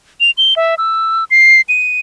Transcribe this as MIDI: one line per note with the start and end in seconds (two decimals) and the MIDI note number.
0.20 0.31 101
0.37 0.54 103
0.56 0.75 76
0.78 1.24 88
1.30 1.61 96
1.69 2.00 99